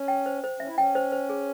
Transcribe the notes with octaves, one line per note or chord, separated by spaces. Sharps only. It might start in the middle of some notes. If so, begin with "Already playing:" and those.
Already playing: C#4
G5
C5
C5
C#4 E5
E4
C#4 G5
C5
C5
G#4